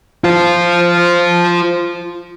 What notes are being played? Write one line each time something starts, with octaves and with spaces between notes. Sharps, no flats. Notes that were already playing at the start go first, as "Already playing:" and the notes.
F4 C5